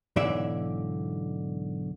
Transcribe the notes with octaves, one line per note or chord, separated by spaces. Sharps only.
B1 G#2 D3 E3 D5 E5